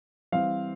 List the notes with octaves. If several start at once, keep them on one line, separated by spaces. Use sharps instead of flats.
E3 G3 C4 F5